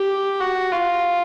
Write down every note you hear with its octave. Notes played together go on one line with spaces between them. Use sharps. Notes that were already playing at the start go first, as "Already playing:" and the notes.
Already playing: G4
F#4
F4